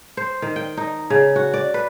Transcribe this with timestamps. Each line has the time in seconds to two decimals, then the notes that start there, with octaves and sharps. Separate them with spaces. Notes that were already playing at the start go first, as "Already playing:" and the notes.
0.17 C5
0.42 D#3
0.56 G5
0.77 D#4
1.10 C#3
1.36 F#4
1.54 D5
1.74 B4